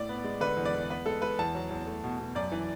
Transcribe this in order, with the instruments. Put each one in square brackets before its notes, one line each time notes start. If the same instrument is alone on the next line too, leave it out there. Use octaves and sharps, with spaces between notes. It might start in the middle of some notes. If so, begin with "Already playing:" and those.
Already playing: [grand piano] A2 D5
B3
G#3
D3 B4
E2
D5
E2
B3 B4
G#3 A4
G#3 B4
E2 A5
F#3
E2
A3
B2
B2
F#2 D5
E3